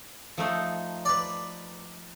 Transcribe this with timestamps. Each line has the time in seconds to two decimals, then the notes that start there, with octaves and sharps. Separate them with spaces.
0.38 F3 A3 D#4
1.05 B4 D5